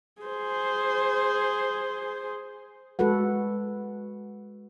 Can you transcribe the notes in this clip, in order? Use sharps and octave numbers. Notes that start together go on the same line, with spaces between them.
G#4 C5
G#3 F#4 A4 B4 F#5